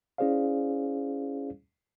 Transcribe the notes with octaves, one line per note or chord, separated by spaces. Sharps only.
C#4 E4 G#4 C5 D5 F5